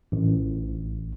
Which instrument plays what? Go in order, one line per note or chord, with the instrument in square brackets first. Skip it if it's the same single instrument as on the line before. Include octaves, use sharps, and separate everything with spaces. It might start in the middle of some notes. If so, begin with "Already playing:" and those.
[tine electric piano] A1